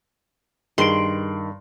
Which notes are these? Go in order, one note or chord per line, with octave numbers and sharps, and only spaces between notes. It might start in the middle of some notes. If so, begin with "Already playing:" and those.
G2 D#3 G#4 C6 D7